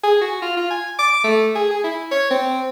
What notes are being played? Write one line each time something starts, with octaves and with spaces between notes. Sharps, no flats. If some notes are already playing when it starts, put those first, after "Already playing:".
G#4
F#4
F4
F4
G#5
D6
A3
G#4
G#4
E4
C#5
C4